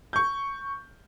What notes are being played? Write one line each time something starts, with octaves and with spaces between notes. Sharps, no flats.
C#6 G6